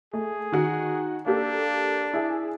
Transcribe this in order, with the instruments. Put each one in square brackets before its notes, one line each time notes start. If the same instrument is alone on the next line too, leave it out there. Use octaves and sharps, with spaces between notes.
[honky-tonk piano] A3 [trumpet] G#4
[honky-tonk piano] D#3 F#4 C#7
[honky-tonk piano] A#3 G4 A4 [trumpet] D4
[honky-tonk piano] E4 G#4